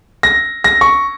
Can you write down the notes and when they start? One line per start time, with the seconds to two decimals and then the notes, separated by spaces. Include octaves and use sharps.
0.23 A#6
0.64 A#6
0.81 C#6